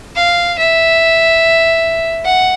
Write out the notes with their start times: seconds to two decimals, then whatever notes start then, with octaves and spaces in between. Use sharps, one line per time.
0.16 F5
0.58 E5
2.25 F#5